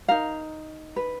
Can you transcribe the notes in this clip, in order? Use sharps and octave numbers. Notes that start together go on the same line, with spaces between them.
D#4 A#4 F5
B4